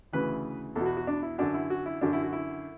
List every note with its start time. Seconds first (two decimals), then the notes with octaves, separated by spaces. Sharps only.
0.13 D2 C#3 E3 B4
0.76 E2 A4
0.80 B2
0.86 F#4
0.97 F#4
1.07 D4
1.23 E4
1.38 F#2 D3 D4
1.54 E4
1.70 F#4
1.86 E4
2.01 F#2 D3 D4
2.13 E4
2.23 F#4
2.33 E4